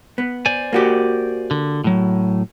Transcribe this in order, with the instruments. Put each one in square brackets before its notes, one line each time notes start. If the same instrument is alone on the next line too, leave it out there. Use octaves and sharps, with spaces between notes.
[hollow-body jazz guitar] B3
[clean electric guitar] C5 D5 G#5
[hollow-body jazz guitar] A#3 F#4 G4
[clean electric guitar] D3
A2 F#3